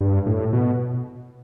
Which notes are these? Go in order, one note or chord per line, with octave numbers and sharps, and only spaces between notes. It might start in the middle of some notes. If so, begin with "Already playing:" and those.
G2
A2
B2